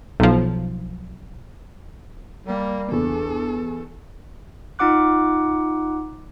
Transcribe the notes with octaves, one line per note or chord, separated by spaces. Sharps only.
B1 F3
G3 A#3
E2 D4 A4
D#4 F4 F#5 D6 F#6